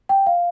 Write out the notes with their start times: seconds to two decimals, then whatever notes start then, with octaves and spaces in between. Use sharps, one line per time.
0.09 G5
0.27 F5